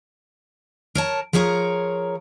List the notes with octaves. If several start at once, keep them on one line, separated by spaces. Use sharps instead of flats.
A#4 C#5 A5
F3 G#4 A#4 C#5 A#5